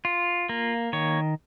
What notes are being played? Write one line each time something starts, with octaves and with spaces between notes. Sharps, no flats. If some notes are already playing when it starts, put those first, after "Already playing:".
F4
A#3
D#3 C#5